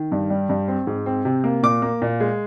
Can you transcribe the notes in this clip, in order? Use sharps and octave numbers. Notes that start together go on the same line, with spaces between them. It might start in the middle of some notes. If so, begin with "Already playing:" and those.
Already playing: D#3
G2
G3
G2
C4
G#2
C4
C3
A#3
A#2 D6
A#3
A#2
G#3